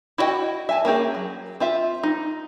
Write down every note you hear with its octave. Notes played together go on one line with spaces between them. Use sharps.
E4 F#4 C#5 D#5 G5
E5 G#5 A5
A#3 C#4 G4 G#4
F#3
C4 F4 E5
D#4